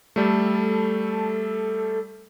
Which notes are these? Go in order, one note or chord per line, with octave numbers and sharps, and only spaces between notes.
G3 A3 A4